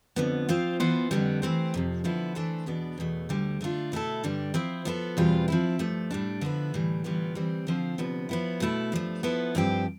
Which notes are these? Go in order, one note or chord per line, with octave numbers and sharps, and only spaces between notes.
F2 D3 F3 B3
F3 C4 F4
E3 B3 F4 C5
F2 D3 G3 B3
E3 A3 C4 G4 C5
F2 C3 F3
D3 F3 B3 E4
E3 A3 D4 A4 C5
E2 B2 B3 D4
E2 B2 A3
D2 D3 G3
D3 A3 D4 F4
B2 A3 E4 A4
G2 D3 G3 D4
F3 C4 E4
F3 B3 E4 A4
E2 B2 G3 C4 F4
F3 C4 E4
G2 F3 A3
A2 G3 D4
D3 F3 B3 E4
A2 E3 G3
A2 E3 G3 B3 F4
E3 G3 C4
D3 F3 C4 F4 C5
D2 C3 F3 B3
F3 B3 E4
B2 A3 E4
G2 F3 A3
F3 B3 E4 A4
G2 F3 C4 G4